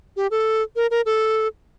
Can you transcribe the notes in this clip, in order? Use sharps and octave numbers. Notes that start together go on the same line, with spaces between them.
G4
A4
A#4
A#4
A4